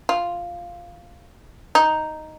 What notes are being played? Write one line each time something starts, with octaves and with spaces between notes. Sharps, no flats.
F4
D#4